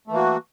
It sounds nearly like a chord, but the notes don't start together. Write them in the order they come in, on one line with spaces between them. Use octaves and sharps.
A3 E3 A#3 F#4